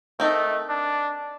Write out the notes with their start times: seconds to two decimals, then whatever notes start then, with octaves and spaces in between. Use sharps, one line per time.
0.20 A3 C4 D#4 A#4
0.69 D4